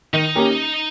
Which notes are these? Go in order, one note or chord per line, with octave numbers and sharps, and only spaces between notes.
D#3 D#4
A#3 C#4 G4 A#4